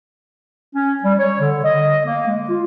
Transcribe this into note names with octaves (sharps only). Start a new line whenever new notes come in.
C#4
G3
C#5
D3
D#5
A#3
G#3
F4